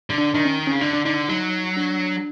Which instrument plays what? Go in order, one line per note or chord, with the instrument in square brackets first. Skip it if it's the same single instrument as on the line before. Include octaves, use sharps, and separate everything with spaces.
[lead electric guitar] D3
[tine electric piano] D4
[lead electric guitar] D#3 [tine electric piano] D4
[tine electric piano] C#4
[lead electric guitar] C#3 [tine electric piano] C#4
[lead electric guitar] D3 [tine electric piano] D4
[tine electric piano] D4
[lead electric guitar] D3 [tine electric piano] D#4
[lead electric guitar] F#3 [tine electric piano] D#4
[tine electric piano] D4